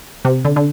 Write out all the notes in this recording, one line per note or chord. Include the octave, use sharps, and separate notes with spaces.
C3
D3
D3